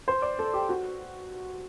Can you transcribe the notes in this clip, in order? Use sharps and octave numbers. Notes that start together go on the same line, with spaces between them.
C5
D5
A4
G4
F#4